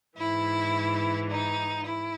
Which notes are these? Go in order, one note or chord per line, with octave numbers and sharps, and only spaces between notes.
G#2 E3 E4
D#4
E4